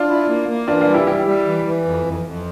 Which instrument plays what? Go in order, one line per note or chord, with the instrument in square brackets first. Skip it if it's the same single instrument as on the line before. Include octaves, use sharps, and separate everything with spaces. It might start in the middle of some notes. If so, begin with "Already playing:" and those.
Already playing: [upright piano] D4 F4
[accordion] E4
A#3
A#3
[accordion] E3 [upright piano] D4 F4
[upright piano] D4 F4
[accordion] G3
[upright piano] E4 G4
[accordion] G3 [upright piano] E4 G4
[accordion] G3
E3
E3
F2
F2
F2